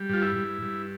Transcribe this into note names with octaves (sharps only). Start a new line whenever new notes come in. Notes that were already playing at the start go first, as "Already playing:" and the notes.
Already playing: G3
G2 F4
E4
G2
G2